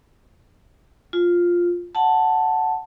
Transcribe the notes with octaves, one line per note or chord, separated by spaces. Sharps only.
F4
F#5 A5